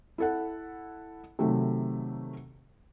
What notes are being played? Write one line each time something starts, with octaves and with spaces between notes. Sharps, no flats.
E4 A4 F#5
C3 D#3 F#3 A3